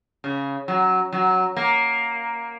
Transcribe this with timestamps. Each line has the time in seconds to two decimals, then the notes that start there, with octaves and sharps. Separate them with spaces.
0.24 C#3
0.68 F#3
1.13 F#3
1.57 A#3